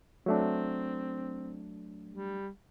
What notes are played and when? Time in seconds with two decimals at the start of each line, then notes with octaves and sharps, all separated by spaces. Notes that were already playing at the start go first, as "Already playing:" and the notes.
0.26 F#3 A3 C4 D4
2.12 G3